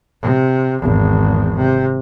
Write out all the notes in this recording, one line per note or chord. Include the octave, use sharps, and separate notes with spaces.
C3
G#1 E2
C3